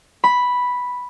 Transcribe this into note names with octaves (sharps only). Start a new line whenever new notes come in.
B5